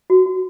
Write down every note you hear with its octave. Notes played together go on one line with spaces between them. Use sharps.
F#4
F#4